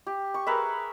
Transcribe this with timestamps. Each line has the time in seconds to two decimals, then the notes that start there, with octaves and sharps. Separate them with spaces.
0.07 G4
0.34 C#6
0.47 G#4 A#4 B4 E5